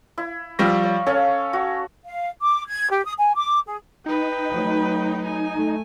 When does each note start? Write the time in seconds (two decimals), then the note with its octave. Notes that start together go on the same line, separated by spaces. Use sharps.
0.18 E4
0.59 F3 G3 E5 F5 C#6 A#6
0.84 C#5
1.07 C#4 A4 C#5 F5
1.53 F#4
2.04 F5
2.41 D6
2.67 G#6
2.90 G4
3.05 D#6
3.17 G#5
3.34 D6
3.66 G#4
4.06 D#4 B4 G5
4.48 F#3 A3
5.26 G#5
5.54 A3